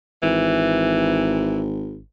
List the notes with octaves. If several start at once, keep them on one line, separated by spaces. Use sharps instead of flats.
G#1 E3